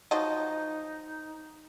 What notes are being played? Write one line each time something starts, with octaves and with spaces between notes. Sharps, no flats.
F3 F#3 D#4 D#5